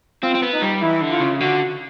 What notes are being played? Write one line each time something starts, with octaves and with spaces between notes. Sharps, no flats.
C4 F4
C4
B3
D#4
G3
E3 E4
D3
F4
C#3
D3 F#4